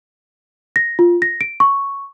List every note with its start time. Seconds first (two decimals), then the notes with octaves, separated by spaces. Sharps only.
0.76 A#6
0.99 F4
1.22 A#6
1.41 D7
1.60 C#6